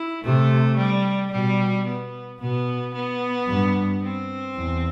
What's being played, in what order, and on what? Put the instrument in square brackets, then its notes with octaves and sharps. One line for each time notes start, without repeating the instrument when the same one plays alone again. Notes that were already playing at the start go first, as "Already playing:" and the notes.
Already playing: [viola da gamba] E4
[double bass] C3 [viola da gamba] A3
[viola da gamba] G3
[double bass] B2 [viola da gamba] G3
[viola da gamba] B3
[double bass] B2 [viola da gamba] B3
[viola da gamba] B3
[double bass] G2
[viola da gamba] C4
[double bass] E2